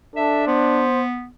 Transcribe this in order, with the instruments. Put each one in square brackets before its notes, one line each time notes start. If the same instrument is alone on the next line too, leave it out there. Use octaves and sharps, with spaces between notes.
[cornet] D4 [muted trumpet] A4 [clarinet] E5
[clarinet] B3 [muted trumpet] C5